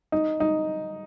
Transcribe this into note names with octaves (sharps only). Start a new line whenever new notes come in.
D#4
D#4